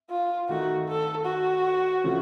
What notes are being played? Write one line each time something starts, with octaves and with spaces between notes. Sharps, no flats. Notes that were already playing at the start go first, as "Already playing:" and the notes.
F4
D#3 A3 D#4 F#4
A4
F#4
C#3 F3 A3 C#4 F4